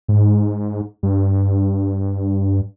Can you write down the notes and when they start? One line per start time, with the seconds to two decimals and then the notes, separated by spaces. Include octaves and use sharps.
0.08 G#2
1.03 G2